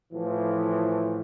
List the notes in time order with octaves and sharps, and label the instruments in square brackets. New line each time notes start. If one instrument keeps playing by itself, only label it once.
[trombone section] A2 E3 F3